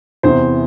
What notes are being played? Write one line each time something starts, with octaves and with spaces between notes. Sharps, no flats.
E2 C3 E3 C5